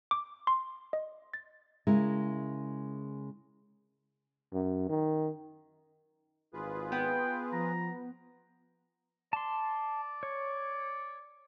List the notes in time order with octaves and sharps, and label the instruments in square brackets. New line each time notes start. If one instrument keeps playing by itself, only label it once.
[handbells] D6
C6
D#5
A6
[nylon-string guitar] C#3 G#3 E4 A#4
[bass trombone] F#2
D#3
[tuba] G#1 [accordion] F4 G#4 B4
[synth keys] B3 [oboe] G5
[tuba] F3 [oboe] A#5
[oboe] D5 [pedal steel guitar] A5 C6
[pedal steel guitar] C#5